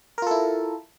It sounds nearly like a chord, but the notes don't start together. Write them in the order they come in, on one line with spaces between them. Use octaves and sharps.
A#4 F4 A4 E4